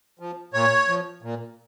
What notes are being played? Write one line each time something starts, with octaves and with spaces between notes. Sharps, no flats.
F3
A#2 C#5
F3
A#2